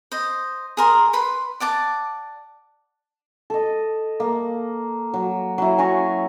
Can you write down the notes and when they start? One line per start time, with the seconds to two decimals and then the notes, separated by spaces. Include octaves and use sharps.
0.12 C5 D#5
0.77 G#4 A#4 C6
1.13 B4 B5 C6
1.60 D5 F#5 A5 D6
3.50 A4 D#5
4.20 A#3
5.14 F#3
5.58 F#3 E4
5.78 C#4 G#5 A#5 C#6